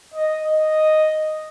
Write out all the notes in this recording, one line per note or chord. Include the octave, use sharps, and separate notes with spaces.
D#5
D#5